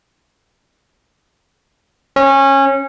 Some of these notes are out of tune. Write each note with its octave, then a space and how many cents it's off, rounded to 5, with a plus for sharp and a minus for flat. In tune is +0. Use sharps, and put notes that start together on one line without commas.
C#4 -20